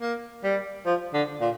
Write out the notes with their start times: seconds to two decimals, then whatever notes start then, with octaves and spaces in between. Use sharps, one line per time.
0.01 A#3
0.44 G3
0.86 F3
1.14 D3
1.41 A#2